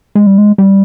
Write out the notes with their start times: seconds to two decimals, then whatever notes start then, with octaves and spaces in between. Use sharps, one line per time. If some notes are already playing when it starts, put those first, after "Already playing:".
0.15 G#3
0.27 G3
0.38 G#3
0.58 G3